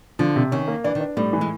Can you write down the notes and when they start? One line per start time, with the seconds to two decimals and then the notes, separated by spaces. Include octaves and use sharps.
0.19 D3 F3
0.36 C3
0.52 D#3 C#4
0.68 A#3
0.84 E3 D4
0.95 D#3
1.00 D4
1.17 A2 G3
1.33 E3
1.41 G#3